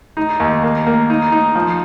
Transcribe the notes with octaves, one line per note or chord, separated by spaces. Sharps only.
D#4
D#2
A#3
A#3
D#4
D#4
F3